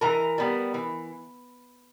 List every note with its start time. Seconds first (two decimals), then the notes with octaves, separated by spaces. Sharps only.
0.01 E3 A#4 A#5
0.38 G3 B3
0.74 E3